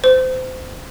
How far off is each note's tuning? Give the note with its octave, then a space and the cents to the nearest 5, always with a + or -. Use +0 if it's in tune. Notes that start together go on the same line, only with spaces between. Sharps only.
C5 -25